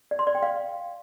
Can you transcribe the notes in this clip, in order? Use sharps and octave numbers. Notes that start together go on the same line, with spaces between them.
D5
C6
D5
G5
F5